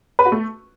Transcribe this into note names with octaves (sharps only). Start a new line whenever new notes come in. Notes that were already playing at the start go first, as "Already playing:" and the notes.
B4
F#4
A3